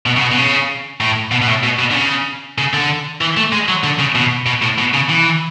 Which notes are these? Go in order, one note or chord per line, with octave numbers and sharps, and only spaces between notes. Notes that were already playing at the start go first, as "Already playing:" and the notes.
B2
C#3
B2
B2
C#3
A2
B2
B2
A2
B2
B2
D3
C#3
C#3
D3
E3
A3
G#3
F#3
D3
C#3
B2
B2
A2
B2
C#3
E3